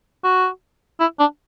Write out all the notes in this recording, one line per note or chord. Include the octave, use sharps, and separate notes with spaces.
F#4
E4
D4